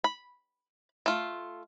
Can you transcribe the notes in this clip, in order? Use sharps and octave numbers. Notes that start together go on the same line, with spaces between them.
B5
A3 F4